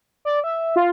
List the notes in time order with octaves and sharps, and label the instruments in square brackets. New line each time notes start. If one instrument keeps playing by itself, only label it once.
[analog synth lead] D5
E5
[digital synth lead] F4